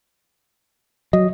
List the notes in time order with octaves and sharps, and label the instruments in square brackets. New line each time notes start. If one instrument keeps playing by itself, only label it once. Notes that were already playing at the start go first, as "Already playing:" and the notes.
[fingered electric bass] F#3 [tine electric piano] D#5